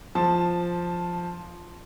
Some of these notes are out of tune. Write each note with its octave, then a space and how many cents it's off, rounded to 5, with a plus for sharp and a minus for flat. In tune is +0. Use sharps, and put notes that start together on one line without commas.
F3 +0 A5 +0